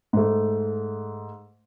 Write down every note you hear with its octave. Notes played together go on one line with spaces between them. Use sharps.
G#2 A3